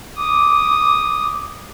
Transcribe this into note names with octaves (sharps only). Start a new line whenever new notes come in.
D6 D#6